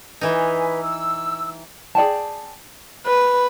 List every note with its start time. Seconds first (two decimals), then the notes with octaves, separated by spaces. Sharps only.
0.21 E3 D#4 B4 G#5
0.80 E6
1.95 G#4 D5 G5 A5
3.06 B4